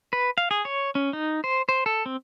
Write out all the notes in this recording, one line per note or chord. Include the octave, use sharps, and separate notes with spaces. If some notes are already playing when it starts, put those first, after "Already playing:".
B4
F5
G#4
C#5
C#4
D#4
C5
C5
A4
C4